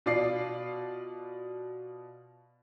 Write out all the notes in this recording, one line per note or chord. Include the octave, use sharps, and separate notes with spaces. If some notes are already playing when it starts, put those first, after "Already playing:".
B2 F4 D5 C7